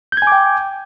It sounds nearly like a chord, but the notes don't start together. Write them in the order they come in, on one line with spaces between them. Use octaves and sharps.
G6 G#6 G#5 D6 G5